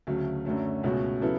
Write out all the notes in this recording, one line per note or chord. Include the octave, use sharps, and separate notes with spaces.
D2 C#3 F#3 A3
F#2 D3 F#3 A3 C#4
C#2 B2 A3 C#4 F#4
C#3 F#3 B3 E4 A4